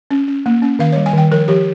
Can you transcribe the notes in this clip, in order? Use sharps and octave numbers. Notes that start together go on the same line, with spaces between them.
C#4
C#4
A#3
C#4
D#3 F5
C#5
G3
G#5
D#3 G5
F3 A#4
F3 G4